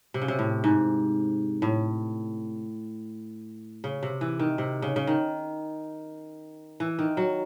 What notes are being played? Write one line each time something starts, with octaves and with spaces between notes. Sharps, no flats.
C3
C#3
C3
A2
G#2
A2
C#3
C3
E3
D#3
C3
C#3
C#3
D#3
E3
D#3
F#3